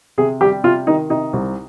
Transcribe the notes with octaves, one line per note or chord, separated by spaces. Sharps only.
C3 G#4
G3 G4
C3 F4
D#3 D#4
C3 D#4
C2